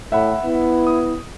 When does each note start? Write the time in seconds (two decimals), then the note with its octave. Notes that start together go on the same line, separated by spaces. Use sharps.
0.12 A2 E5 F#5 B5
0.44 B3 E4
0.87 D#6